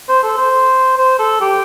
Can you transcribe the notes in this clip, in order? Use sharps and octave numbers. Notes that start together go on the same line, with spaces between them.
C5
A4
C5
C5
A4
G4